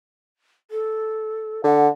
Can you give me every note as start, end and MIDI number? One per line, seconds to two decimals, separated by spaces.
0.71 1.61 69
1.64 1.89 50
1.64 1.87 78